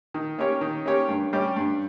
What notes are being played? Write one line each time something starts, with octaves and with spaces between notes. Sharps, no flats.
D#3
A#3 C#4 G4 C#5
D#3
A#3 C#4 G4 C#5
G2
G3 C#4 G4
G2